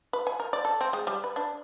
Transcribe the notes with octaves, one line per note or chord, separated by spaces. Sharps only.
B4
G#5
A#4
D5
A4
C4
G#3
G3
B4
D4